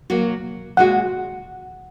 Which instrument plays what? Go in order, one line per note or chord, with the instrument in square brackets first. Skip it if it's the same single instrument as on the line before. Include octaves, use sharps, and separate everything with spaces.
[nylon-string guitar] F#3 A#3 F#4
[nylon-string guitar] A#2 G#3 F#4 [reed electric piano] F#5